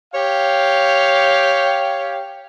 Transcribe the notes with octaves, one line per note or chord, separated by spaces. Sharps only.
G4 C#5 F5 G5